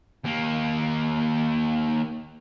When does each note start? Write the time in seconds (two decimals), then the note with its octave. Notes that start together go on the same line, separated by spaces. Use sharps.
0.25 D#2 A#3